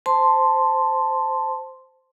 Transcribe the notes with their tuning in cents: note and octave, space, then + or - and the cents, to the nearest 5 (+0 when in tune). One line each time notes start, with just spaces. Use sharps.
C5 -5 A5 +0 C6 +0